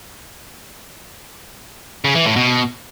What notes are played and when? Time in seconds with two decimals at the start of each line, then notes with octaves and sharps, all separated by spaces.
2.05 C#3
2.15 E3
2.26 A2
2.36 B2